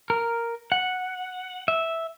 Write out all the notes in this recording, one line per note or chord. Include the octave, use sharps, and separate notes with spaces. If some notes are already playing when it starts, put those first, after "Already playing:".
A#4
F#5
E5